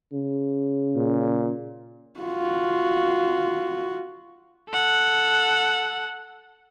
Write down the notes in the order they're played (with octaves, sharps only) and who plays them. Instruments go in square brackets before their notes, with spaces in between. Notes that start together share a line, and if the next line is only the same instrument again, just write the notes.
[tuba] C#3
[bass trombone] A#2
[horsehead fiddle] F4 F#4
[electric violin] A4 F#5